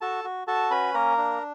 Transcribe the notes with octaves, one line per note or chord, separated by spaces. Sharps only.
F#4 A4 A5
F#4
F#4 A4 A5
C#4 B4 B5
A#3 A#4 A#5
D4